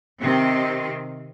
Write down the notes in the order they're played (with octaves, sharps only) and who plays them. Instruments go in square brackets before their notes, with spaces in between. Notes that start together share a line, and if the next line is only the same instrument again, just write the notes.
[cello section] C3 D#3 C4